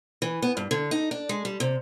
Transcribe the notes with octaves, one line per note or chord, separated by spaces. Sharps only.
E3
B3
G2
D3
D#4
D4
G#3
G3
C3